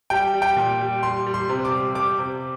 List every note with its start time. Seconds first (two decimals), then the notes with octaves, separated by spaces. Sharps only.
0.10 G3 G5
0.34 G3
0.42 G5
0.57 A#2
0.81 G3
1.03 G3 C6
1.26 G3
1.34 C6
1.49 C3
1.65 D6
1.72 G3
1.95 G3 D6
2.18 C3